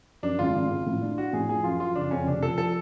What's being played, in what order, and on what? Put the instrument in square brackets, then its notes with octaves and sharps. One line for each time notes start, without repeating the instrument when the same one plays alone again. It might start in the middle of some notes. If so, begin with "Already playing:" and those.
[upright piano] F#2 [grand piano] D4
[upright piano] G#1 [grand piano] F4
[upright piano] G#1
G#1
A2
D4
[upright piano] D4 [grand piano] F#4
[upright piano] A2 [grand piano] G#4
[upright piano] F3 [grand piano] G#4
[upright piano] F#2 [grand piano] F4
[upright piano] F3 [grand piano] F4
[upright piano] F#1 [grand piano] D4
[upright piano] F2 [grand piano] C#4
[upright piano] F1 [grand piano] D4
[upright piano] F3 [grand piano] A4
[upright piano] F3 [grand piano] A4